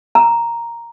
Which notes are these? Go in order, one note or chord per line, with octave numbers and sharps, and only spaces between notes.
A#5